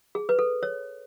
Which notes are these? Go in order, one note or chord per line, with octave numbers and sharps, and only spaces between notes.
G#4
B4
A4
C#5